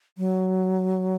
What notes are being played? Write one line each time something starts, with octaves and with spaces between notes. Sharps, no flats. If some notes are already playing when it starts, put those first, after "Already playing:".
F#3